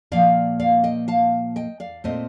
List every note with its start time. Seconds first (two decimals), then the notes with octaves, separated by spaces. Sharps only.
0.12 A#2 F3 A#3 D5 F5
0.60 D5 F5
0.84 D#5 G5
1.08 F5 A5
1.56 D#5 G5
1.80 D5 F5
2.04 A#2 A3 C4 C5 D#5